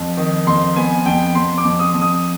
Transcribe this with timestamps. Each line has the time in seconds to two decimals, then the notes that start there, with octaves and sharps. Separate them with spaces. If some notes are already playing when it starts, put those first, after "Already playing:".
Already playing: F2
0.17 D#3
0.47 F2 C6
0.76 B3 G#5
1.06 F2 G5
1.35 F2 C6
1.58 D6
1.64 F2
1.79 D#6
1.94 F2
2.01 D#6